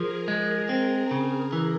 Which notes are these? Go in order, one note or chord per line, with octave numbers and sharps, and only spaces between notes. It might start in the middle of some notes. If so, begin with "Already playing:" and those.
Already playing: F3 G#4 A#4
G#3
C4
C#3
E3